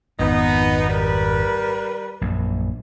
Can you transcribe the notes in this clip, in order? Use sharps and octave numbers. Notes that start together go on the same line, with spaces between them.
G#1 F2 B3 D#4
G3 A#4 B4
A#1 F#2